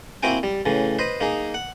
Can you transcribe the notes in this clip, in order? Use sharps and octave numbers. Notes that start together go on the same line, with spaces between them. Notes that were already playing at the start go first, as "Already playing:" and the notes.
A#3 C4 E4 F#4 G5 G#5
G3
A2 C#3 E3
B4 C5 D#5
A#3 D#4 G#4
F#5